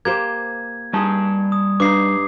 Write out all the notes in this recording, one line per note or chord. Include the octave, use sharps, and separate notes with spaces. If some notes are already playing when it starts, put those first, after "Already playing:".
A#3 G4 C5 G#6
G3 D#4 G#4 A5
D#6
G2 D#4 D6 C7